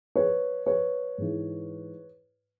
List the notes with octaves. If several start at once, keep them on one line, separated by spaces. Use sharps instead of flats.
B4 C#5
B4 C#5
G#2 E3